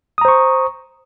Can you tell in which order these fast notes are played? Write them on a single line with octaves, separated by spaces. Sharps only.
D#6 A#5 C5 C#6